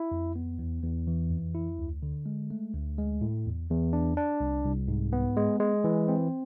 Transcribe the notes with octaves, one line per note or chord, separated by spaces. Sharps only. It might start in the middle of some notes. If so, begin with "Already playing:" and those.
Already playing: E4
F2
B3
E2
E2
E3
F2
E4
D2
D3
G#3
A3
D2
G#3
A2
E2
E2
D4
D4
C2
C2
G#2
B3
G#3
G#3
E3
C4